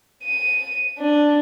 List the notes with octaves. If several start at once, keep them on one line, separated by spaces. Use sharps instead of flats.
D#7
D4